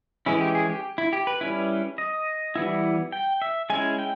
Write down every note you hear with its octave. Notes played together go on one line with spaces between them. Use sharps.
E3 G#3 C#4 E4
G4
G#4
G4
E4
G4
B4
G3 C#4 E4
D#5
E3 G3 B3 E4
G5
E5
G#3 C#4 E4 G#5
G5